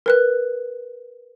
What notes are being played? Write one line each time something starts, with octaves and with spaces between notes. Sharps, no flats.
A#4 B4 F#6